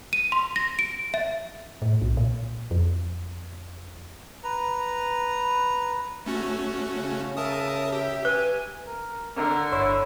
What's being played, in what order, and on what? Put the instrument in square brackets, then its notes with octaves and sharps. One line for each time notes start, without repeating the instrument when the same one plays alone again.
[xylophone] D#7
C6
A#6
D7
E5
[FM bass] A2
B1
A#2
F2
[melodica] B4 A#5
[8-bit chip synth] A3 C#4 F#4
[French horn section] C#3
[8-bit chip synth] A#4 A5 D#6 [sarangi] E5
[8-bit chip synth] G4
[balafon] B4 [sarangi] G#5
[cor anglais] A#4
[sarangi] D3 [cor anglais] A#4
[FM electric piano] G1 C#5 C6 [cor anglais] E4